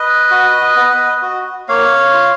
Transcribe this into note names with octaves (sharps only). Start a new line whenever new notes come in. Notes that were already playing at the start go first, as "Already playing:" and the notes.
Already playing: B4 D#5
F#4
B3
F#4
A#3 C#5 F5
F4